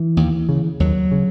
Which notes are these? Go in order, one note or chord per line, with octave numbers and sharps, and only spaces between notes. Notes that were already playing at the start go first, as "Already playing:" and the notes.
Already playing: E3
D#2
C#3
D#2 F#3
C#3